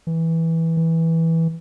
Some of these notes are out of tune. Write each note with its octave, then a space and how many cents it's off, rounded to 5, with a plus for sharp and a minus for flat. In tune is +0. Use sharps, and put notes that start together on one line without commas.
E3 -10
E3 -10